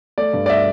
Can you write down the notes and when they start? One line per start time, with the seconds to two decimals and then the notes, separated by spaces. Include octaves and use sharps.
0.18 A3 D5
0.33 G2
0.46 D5
0.50 E5